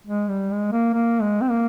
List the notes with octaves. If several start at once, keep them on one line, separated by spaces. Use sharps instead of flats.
G#3
G3
G#3
A#3
A#3
G#3
C4
A#3